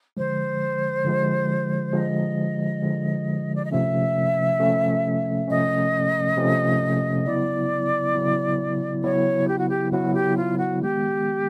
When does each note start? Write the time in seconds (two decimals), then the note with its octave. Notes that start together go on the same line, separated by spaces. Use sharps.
0.17 D3 F3 G#3 C5
1.04 D3 F3 G#3
1.93 D3 F3 G#3 D#5
2.82 D3 F3 G#3
3.56 D5
3.64 D#5
3.71 C3 F3 A3 C#4 E5
4.60 C3 F3 A3 C#4
5.48 C3 F3 A3 C#4 D#5
6.36 C3 F3 A3 C#4
7.25 C#3 F#3 B3 E4 D5
8.15 C#3 F#3 B3 E4
9.04 C#3 F#3 B3 E4 C#5
9.48 G4
9.57 F#4
9.67 G4
9.92 C#3 F#3 B3 E4 F#4
10.14 G4
10.37 F4
10.58 F#4
10.81 D#3 G#3 B3 G4